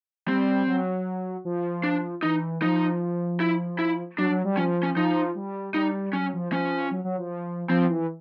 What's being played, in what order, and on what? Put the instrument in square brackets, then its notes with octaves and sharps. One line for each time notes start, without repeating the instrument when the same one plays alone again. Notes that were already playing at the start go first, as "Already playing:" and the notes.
[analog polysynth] G3 [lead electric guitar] C4
[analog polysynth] F#3
F3
[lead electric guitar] D4
[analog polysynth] E3 [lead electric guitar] D#4
[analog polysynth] F3 [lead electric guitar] D#4
[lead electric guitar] E4
E4
[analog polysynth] F#3 [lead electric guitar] D4
[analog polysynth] F#3
G3
[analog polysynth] F3 [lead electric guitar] C#4
[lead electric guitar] C#4
[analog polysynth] F3 [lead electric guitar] D#4
[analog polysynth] G3
[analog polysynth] G3 [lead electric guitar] D#4
[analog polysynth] F#3 [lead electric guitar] C#4
[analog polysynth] F3
[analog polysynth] F3 [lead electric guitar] C#4
[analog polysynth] F#3
F#3
F3
[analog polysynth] F3 [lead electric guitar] C4
[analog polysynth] E3